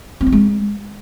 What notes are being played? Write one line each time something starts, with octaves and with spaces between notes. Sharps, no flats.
C4
E4
G#3